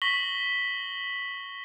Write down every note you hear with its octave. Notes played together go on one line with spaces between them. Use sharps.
C#6 A#6 B6 F#7 G7